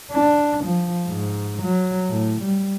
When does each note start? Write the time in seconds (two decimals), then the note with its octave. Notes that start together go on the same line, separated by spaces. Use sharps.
0.12 D4
0.64 F3
1.07 G#2
1.62 F#3
2.10 A2
2.41 G3